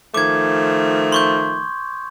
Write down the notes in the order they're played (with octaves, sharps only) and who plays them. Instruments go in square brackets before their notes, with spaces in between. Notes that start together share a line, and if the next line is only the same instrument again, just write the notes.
[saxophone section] D#3 F3 A3 [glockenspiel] D6 G#6
[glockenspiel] C6 C#6 G6